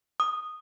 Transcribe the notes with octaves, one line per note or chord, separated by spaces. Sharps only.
D#6